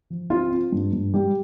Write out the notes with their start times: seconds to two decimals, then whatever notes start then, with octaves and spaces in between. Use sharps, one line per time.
0.10 F3
0.30 C4 F4
0.52 C4
0.72 G2
0.93 G2
1.14 G3 G4